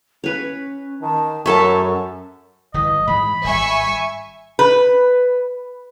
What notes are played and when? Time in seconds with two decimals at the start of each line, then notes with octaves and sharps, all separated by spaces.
0.24 C#4 B4 C#5
1.01 D#3 A5
1.46 F#2 A4 A#4 C#5 E5 A5
2.74 G1 E3 D#5
3.07 G#2 E3 G#3 B5
3.44 G#1 G3 E5 G#5 C#6
4.59 B4